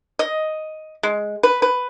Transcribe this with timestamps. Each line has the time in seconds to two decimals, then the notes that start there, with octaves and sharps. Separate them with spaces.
0.19 D#5
1.03 G#3
1.43 B4
1.62 B4